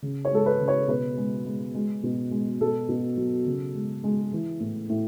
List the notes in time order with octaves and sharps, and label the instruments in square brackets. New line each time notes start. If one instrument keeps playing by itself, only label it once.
[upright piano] C#3
C#5
G#3 A4
B4
C#3
C#5
B2 B4
G#3
G#3
G#3
B2
G#3
B2 A4
B2
F#3
C#3
G#3
G#3
E3
A2
A2